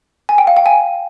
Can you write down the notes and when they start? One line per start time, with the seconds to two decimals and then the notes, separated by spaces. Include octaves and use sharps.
0.29 G#5
0.38 G5
0.47 F5
0.57 G5
0.66 G#5